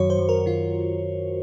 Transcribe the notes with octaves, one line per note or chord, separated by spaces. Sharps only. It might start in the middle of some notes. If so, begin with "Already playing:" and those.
Already playing: F#2 D#3 F#3 F#4 C#5
C5
F#2
A#4
D#3 F4